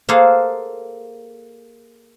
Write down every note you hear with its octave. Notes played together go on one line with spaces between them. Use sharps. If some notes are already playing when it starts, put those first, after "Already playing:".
A#3 G#4 A4 C5 F5 F#5